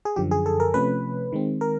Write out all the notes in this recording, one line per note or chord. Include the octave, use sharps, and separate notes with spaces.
G#4
F#2 D3 F3 G4
G#4
A4
A#4
C3 F3 A3 C#4 B4
D#3 G#3 C4
A#4